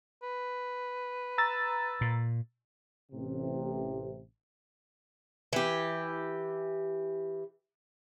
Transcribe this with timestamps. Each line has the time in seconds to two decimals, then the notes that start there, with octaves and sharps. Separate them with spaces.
0.23 B4
1.38 A#5 E6 A6
2.01 A#2
3.12 A1 C3
5.53 E3 G4